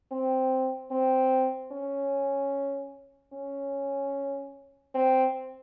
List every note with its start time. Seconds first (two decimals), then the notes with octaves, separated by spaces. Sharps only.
0.11 C4
0.91 C4
1.72 C#4
3.33 C#4
4.95 C4